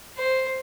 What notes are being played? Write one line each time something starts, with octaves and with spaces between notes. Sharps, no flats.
C5